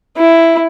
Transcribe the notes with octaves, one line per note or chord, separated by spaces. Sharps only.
E4